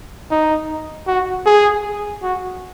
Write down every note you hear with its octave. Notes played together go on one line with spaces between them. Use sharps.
D#4
F#4
G#4
F#4